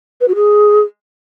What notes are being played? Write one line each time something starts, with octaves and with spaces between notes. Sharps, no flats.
B4
F#4
G#4